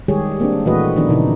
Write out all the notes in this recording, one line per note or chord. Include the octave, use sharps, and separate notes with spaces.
D#3 G3 G#3 G4 G#4 C#5
A#3 C4 D4
A#2 E3 A3 F#4 B4 D#5
D#3 F3 B3 D4 D#4
A#2 C#3 D#4 E4